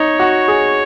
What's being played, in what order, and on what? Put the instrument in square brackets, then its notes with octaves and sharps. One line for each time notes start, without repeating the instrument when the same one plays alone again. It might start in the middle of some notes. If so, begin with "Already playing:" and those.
Already playing: [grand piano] D#4 [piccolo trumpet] C#5
[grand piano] F#4
G#4